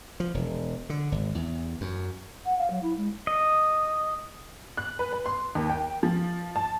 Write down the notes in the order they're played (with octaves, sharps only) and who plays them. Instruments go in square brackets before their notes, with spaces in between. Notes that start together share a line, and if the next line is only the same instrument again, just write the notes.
[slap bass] F3
E1
D3
G#1
E2
F#2
[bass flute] F#5
F5
F#3
E4
G#3
[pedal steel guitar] D#5
[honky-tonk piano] F#6
B4
B4
C6
D#2
G5
F3
A5